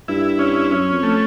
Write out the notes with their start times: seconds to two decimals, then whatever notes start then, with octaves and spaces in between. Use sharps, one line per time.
0.08 G2 E4
0.39 C#4
0.71 F#2 C#4
0.93 F2
1.03 A3